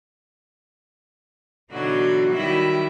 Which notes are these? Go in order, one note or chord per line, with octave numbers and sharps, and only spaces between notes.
B2 D3 E3 F#3 D#4 F#4
D#3 F#3 G3 E4 E5